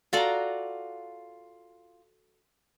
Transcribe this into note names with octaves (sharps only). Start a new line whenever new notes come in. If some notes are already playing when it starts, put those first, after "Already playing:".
F4 F#4 A4 D5 A#5